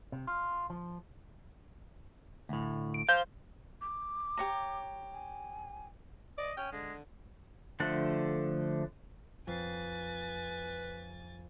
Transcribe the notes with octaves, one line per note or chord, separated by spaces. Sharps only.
C3
F4
F3
D2 A2
D7
C5 F5 G6
D6
G4 C#5 A#5
G#5
D5 D#5
C#4 G5
D3 G#3
D3 F3 A3 A4 F#5
F2 B4 G#5 A6 C7